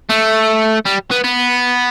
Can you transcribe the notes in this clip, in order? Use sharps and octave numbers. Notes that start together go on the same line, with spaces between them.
A3
G3
B3
B3